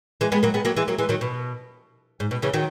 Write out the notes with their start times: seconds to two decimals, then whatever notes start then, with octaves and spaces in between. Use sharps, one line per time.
0.21 E3 G#3
0.32 G#3 B3
0.43 F#3 A#3
0.54 G#3 B3
0.65 F#3 A#3
0.77 E3 G#3
0.88 F#3 A#3
0.99 E3 G#3
1.09 D#3 F#3
1.21 B2
2.20 G#2
2.31 B2
2.42 C#3 E3
2.54 D#3 F#3